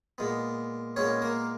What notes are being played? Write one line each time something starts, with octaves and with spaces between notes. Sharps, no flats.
A#2 G#3 B3
A#2 G#3 B3 C#4 C#5
A#3 A#4